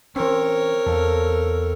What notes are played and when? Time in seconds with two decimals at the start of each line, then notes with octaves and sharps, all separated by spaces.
0.16 E3 C4 C#4 A#4 C#5
0.86 E2 A4 F5